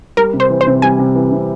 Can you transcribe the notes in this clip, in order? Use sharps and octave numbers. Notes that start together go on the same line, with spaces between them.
G3 A#4
C3
C5
E3
C5
C3
G3 G#5
C3
E3
C3